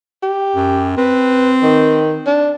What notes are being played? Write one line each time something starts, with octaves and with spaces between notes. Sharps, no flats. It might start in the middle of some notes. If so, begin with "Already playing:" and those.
G4
F#2
C4 B4
D#3
D4